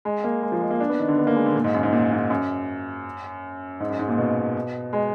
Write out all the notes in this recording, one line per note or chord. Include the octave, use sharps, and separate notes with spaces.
G#3
A#3
G#3
F3
G#3
A#3
D4
B3
D#3
D3
B3
A#3
G#3
D3
A#2
G#2
F#2
G#2
A#2
G#2
F#2
G#2
F#2
G#2
A#2
B2
G#3